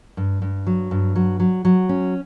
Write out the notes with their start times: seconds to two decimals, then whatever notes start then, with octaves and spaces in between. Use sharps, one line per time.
0.17 G2
0.42 G2
0.67 F#3
0.91 G2
1.16 F#3
1.40 F#3
1.65 F#3
1.89 C#4